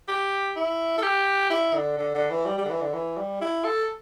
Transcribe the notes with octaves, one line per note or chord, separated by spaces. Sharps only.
G4
E4
A4
G4
E4
D3
D3
D3
E3
G3
G3
D3
E3
D3
E3
G3
E4
A4